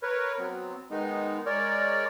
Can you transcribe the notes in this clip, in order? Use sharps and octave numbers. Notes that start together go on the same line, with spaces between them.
A#4 B4 C#5
F#3 B3 C4
D#3 G#3 B3 D#4
G#3 A#4 C#5 D5